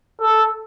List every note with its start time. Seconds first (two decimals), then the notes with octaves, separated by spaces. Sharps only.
0.20 A4